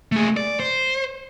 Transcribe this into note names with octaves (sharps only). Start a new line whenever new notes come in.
A3 G#4
D5
C5